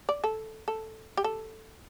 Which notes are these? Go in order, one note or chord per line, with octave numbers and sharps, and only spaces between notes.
D5
A4
A4
G4
A4